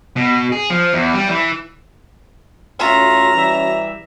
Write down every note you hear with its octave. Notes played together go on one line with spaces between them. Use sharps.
B2
G#4
F3
E2
G3
E3
A2 C#4 F4 F#4 C#5 E5 A#5
E3 G3 E5